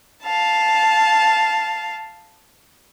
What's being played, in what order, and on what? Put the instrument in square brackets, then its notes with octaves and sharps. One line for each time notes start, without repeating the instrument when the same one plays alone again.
[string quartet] F5 A5